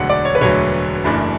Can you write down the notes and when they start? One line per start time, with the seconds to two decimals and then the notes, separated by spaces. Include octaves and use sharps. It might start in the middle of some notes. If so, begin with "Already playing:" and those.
Already playing: E1 D2 D3 F#3 F#5
0.10 D5
0.25 C#5
0.35 B4
0.41 E1 D2 D3 F#3 C#5
1.04 F#1 F#2 E3 A3 D4 B5